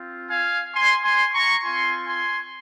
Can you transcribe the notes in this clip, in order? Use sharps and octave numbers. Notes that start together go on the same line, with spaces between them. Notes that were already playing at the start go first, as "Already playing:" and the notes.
Already playing: C4 F4
F5 G#5
G#5 C6
G#5 C6
A#5 C#6
C4 F4 G#5 C6
G#5 C6